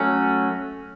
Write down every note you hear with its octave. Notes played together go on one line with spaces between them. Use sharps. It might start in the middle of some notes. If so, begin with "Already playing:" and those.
Already playing: F#3 A3 C#4